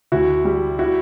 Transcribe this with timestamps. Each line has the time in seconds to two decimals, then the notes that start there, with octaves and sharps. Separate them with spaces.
0.12 D2 E4 F#4
0.45 G3
0.79 E4 F#4